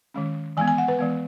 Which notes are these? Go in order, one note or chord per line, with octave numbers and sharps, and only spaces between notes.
D#3 G#3 C#4
E3 G#3 B3 G#5
G#5
F#5
B4
E3 G#3 B3